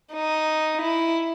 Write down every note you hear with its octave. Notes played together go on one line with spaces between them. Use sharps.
D#4
E4